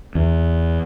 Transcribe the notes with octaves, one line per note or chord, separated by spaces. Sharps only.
E2